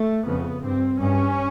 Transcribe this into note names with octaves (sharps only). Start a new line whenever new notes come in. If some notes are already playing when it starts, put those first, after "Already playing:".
Already playing: A3
F2 C#3 B3
G2 C4
G2 C#4